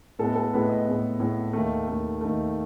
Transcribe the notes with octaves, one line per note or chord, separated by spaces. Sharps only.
A2 G#3 B3 A4
A4
A2 G#3 B3 B4
D#5
A2 G#3 B3
A2 G#3 B3
D#2 D#3 A3
D#2 D#3 A3
D#2 D#3 A3